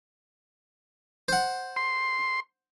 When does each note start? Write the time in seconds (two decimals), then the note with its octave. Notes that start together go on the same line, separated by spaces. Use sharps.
1.28 C5 F#5
1.76 C6